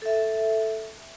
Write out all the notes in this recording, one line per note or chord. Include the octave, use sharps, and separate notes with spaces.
A4 E5